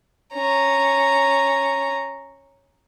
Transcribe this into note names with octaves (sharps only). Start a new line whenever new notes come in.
C#4 A#5